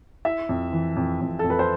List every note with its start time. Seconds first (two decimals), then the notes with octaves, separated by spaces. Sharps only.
0.25 E4 E5
0.49 F2
0.72 E3
0.96 F2
1.21 F2
1.39 A4
1.44 F2
1.50 B4
1.59 C5